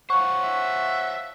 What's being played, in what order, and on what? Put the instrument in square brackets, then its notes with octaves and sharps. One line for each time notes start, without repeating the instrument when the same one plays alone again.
[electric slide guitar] C5 C#5 F5 [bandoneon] F#5 [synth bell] C#6
[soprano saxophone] E5